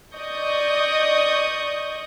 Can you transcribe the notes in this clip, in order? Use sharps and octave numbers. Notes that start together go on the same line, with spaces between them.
D5 D#5 C#6 D#6 G6